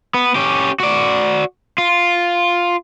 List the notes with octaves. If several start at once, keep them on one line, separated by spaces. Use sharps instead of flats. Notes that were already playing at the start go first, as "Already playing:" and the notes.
B3
C#4 G4
F#4 D5
F4